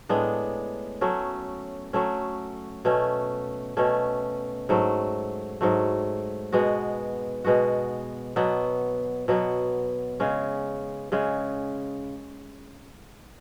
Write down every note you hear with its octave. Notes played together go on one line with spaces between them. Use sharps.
A2 G#3 B3 D4
F#3 A3 C#4
F#3 A3 C#4
B2 A3 C#4
B2 A3 C#4
G#2 F#3 A3
G#2 F#3 A3
B2 G#3 B3 F#4
B2 G#3 B3 F#4
B2 F#3 B3
B2 F#3 B3
C#3 G#3 C#4
C#3 G#3 C#4